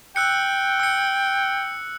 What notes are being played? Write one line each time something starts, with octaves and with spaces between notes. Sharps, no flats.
G5 E6 F#6 C#7
E6 C#7